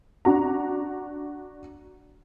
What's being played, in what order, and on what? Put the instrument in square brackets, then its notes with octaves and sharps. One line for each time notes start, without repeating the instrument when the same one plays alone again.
[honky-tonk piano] D4 F#4 A#5